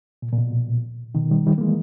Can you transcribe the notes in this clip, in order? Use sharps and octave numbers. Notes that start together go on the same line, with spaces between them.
A#2
A#2
B2
B2 D#3
D#3 G3
D#3 G3
A#3
E3 G#3